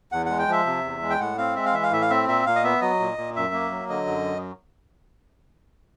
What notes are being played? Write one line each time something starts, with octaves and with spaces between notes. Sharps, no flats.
E2 F#5
G#3 F#5
G5
F3 E5
C3
E2
G#3
G5
A2 F#5
C4 F5
G#3 E5
F5
E3 E5
F5
A2 E5
F5
C4 E5
A#2 E5
A#2 F5
D#5
B3 E5
F#3 D#5
A#2
A#2
F#2 E5
A#3
F#3
D3 D#5
F#2